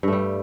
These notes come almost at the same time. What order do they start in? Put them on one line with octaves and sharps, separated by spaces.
G2 A3 G3